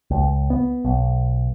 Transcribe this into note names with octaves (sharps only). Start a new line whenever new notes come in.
C#2
B3
B1